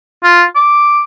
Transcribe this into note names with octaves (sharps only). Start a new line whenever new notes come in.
F4
D6